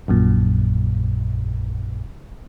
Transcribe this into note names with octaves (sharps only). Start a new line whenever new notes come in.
A#1 F#2 A#2